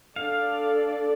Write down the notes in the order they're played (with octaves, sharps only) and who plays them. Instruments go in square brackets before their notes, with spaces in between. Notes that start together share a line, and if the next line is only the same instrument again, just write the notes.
[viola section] D4 A4 D5 [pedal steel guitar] F5